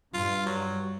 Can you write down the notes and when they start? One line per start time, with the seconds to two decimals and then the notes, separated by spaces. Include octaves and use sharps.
0.14 G2 F4
0.46 F#3